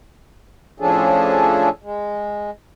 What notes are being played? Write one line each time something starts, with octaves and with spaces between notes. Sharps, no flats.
A2 F3 C#4 D4 G#4 A4
G#3